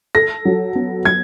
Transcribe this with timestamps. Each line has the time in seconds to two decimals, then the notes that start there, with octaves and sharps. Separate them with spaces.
0.15 A4 A#6
0.45 F#3
0.75 B3
1.05 F#3 G#6